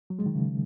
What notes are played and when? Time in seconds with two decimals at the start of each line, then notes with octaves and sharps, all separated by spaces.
0.10 F#3
0.19 G#3
0.26 D#3
0.35 C#3